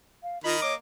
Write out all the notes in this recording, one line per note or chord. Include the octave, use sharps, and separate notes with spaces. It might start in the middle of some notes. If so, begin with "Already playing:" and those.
F5
D#3 F4 A#4 D#5 B5
A#3 C#5 D6